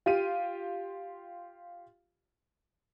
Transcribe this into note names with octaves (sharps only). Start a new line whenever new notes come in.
F4 G4 D#7